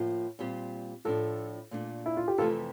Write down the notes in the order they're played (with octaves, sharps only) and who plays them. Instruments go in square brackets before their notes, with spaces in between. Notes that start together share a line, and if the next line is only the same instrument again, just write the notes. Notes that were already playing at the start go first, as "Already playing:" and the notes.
Already playing: [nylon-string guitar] A2 F3 A#3 F4
A#2 G3 C4 G4
[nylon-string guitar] A2 F3 A3 D4 [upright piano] F4 A4
[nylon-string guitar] A#2 A3 D4
[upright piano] E4
F4
G4
[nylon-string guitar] F2 C3 E3 A3 [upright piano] F4 A4